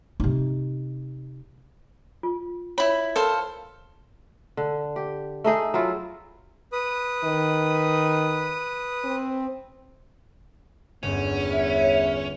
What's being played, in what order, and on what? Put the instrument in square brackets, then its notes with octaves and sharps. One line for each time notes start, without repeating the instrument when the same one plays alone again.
[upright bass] C3 D#4
[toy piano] F4
[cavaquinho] E4 B5 [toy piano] C#5
[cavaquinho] A4 C5 F5 [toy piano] A#4
[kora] D3
G4
A3 D#4 G#4
F#3 E4 F4
[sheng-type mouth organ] B4 D#6
[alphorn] D#3
C4
[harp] G1 [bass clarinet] E2 [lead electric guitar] C#4
[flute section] C#5 E5